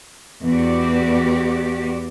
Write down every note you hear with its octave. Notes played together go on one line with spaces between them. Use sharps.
E2 F#4 G4 D5